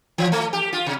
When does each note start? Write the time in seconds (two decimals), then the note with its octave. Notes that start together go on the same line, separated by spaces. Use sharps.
0.18 E3
0.32 A3
0.53 G4
0.73 F4
0.86 C3